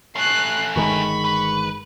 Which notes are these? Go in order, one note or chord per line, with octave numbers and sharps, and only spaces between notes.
A3 C#4 F#6 C7
G1 D#3 G#3 B5 C#6
B4